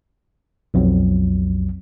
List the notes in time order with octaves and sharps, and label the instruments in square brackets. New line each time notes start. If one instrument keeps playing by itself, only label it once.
[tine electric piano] B1 F2 F#3